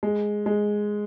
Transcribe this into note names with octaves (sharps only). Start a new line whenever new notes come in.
G#3
G#3